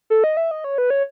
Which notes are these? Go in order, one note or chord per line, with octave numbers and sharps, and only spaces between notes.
A4
D#5
E5
D#5
C#5
B4
C#5